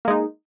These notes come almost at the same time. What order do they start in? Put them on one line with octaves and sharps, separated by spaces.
A#3 G#3 D#4